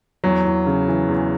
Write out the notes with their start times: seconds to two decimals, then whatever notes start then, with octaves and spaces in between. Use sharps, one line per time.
0.24 E2 F#3
0.45 E2
0.66 C#3
0.88 E3
1.08 E2